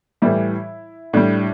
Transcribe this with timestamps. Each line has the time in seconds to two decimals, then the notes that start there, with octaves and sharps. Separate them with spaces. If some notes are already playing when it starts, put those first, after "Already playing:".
0.22 A2 E3 G3 E4
1.13 A2 G3 D4